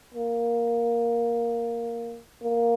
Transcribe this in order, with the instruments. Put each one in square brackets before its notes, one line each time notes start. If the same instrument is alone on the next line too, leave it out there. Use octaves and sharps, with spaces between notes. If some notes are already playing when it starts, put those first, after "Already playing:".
[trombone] A#3
A#3